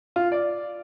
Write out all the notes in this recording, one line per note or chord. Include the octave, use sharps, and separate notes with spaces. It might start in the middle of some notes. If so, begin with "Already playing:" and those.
F4
D5